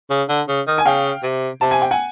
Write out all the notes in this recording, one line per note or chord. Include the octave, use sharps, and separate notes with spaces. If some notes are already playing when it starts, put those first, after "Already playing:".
C#3
D3
C#3
D#3
G#5
C#3 F5 G5
C3
C3 A5
G#5
G5
F#5 G#5